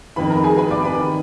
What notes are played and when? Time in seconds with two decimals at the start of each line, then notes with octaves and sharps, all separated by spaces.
0.16 F2 D#3 B4 B5
0.30 A#4 A#5
0.44 G#4 G#5
0.57 B4 B5
0.70 D5 D6
0.84 B4 B5
0.98 D#3